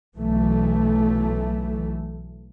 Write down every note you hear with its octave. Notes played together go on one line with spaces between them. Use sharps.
B1 E3 A3